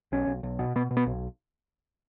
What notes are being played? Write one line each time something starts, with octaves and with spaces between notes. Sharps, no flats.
B1 C#4
B1
B1
B2
B2 B3
B2
B3
B1